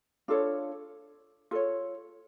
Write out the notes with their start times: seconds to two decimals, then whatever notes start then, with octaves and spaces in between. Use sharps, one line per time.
0.28 D4 F4 A4 C#5
1.51 F4 A4 C#5